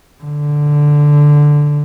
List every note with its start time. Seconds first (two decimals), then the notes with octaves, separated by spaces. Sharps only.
0.24 D3